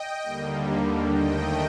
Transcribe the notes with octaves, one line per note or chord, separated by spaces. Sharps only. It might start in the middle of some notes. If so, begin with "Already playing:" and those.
Already playing: D#5 G5
D#2 D3 G3 A#3
D#2 D#3 A3 D#5 G5